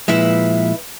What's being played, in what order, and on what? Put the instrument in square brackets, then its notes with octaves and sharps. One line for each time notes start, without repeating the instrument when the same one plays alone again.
[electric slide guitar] A#2 F3 G#3 [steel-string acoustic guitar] E4 B4 E5